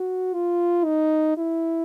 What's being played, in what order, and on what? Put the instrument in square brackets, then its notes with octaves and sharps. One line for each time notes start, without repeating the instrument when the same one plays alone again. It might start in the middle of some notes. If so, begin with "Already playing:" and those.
Already playing: [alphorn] F#4
F4
D#4
E4